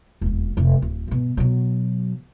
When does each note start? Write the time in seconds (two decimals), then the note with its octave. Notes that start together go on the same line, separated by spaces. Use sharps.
0.21 E1 D#2
0.57 F1 C3
0.82 D1
1.08 G2 B2
1.37 B2 F#3